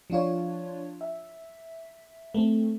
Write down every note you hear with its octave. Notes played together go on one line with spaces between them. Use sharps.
F3 D4 F4 C#5
E5
A3 C4